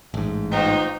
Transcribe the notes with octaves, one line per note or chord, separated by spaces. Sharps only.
A1 G#2
A#3 D#4 F4 C5